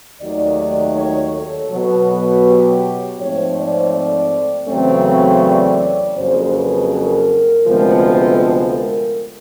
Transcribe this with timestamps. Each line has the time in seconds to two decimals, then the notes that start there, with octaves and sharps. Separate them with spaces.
0.20 D#2 D#3 F#3 A3 D5
0.95 C#5
1.33 A4
1.70 B2 F#3 B3
2.44 G4
3.18 G#2 F3 A3 C4 C#5
3.56 D5
3.93 D5
4.67 E2 C#3 F#3 A3 C4
5.05 C#5
5.42 D5
6.16 F2 C#3 F#3 A#3 C5
6.53 B4
6.91 A#4
7.65 D2 C3 F3 G#3 B3
8.02 A4
8.77 A#4